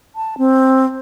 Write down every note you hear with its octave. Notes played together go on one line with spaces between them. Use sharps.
A5
C4